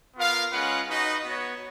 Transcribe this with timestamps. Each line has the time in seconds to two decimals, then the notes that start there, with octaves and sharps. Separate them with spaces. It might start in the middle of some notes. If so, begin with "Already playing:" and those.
0.15 B3 F4 A#4 F5
0.52 G#3 C#4 F4 B4 F#5
0.88 D#4 F#4 B4 D#5
1.24 B3 F#4 C#5